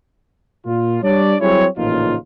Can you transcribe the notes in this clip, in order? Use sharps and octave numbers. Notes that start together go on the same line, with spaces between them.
A#2 F4
G3 D4 C#5 D5
F#3 G3 C4 E4 G#4 C#5
A1 A#2 C#3 F3 D#4 F4